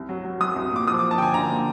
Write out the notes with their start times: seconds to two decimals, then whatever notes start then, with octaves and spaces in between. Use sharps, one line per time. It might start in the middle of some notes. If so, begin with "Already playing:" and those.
Already playing: C2
0.09 F#3
0.25 F#3
0.40 F#3 D#6
0.56 C2
0.72 A#2 D6
0.87 F3 D#6
0.99 F3 D6
1.11 A5
1.18 D3 G5
1.22 G#5
1.34 D3 A#5
1.50 A#3